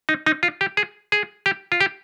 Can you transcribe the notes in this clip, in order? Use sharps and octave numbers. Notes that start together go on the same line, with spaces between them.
D#4
D#4
F4
G4
G#4
G#4
G4
F4
G4